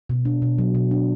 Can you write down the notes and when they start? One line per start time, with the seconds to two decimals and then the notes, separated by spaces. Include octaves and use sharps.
0.10 B2
0.25 D4
0.42 B2
0.58 F#3
0.75 B2
0.91 D4